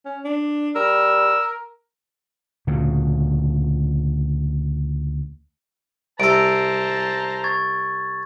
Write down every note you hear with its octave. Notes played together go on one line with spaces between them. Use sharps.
C#4
D4
G3 A#4 E6
D2 A#2 C#3
C2 A4 C5 A5 A#5 D7
C#6 G#6 A6